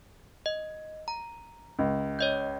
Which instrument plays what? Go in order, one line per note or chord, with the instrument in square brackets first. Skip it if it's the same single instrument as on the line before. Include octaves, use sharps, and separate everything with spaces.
[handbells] D#5
A#5
[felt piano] C#2
[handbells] C#5 D#5 G6